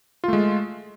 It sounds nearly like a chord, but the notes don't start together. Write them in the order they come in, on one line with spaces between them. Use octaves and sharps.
F4 A3 G#3